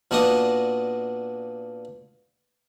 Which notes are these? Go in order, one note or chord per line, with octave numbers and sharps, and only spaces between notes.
A#2 B3 D4 F#4 D#5 D#6